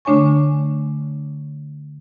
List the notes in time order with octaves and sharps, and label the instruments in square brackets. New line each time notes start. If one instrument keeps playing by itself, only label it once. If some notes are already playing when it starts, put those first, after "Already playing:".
[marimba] D3 A3 D4 C#5 G#5 C#6